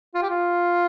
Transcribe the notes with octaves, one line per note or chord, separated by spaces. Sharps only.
F4
G4
F4